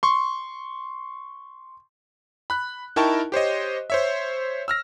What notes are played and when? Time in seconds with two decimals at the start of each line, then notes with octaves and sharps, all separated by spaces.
0.03 C6 C#6
2.50 B5 F#6
2.96 D#4 E4 A#4 G5 A5 C#6
3.32 G4 C5 C#5 D#5
3.90 C5 C#5 E5
4.68 E6 F6 A#6